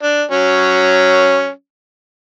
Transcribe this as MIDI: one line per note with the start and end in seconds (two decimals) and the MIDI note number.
0.03 0.23 62
0.31 1.50 54
0.31 1.50 61